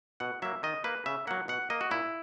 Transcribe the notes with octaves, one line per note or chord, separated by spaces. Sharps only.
B2 F#5
F#3 A#3 E5
D#3 D#5
A#3 B4
C#3 E5
F#3 A#3 F#5
B2 F#5
A#3 D#5
F#4
A#2 E4